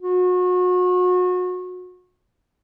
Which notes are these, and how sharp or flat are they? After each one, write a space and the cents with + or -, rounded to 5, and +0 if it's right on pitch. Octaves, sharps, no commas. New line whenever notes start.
F#4 -35